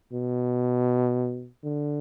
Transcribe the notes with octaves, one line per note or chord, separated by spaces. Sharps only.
B2
D3